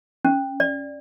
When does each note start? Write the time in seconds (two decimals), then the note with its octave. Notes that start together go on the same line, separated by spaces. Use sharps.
0.25 C#4
0.60 D5